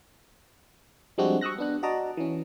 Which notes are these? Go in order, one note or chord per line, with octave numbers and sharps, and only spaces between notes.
F3 G3 G#3 C4 D4 F#4
C#6 D#6 E6 F#6 A#6
B3 D4 F#6
F#4 D5 D#5 A5 A#5 D6
E3 C#4